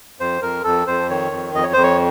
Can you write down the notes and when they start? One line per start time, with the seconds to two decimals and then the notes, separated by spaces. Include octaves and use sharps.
0.20 F2 C5
0.42 F2 A#4
0.64 F2 A4
0.87 F2 C5
1.09 D#3 C#5
1.32 F2
1.54 F2 D#5
1.63 C#5
1.73 F2 C5
1.83 C#5